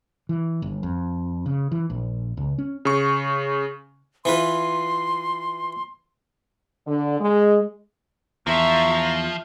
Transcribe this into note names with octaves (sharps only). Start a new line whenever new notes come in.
E3
G1
F2
C#3
E3
A#1
C#2
C#4
C#3 C#6
E3 F4 B4 C6
D3
G#3
E2 F3 E5 A#5 C6 C#6